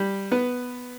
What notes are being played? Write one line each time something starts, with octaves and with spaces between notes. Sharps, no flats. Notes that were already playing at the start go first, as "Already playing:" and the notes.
Already playing: G3 G4
B3 B4